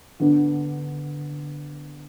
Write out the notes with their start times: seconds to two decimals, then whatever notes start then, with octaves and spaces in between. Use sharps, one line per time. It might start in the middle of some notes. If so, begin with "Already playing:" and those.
0.20 D3 B3 D4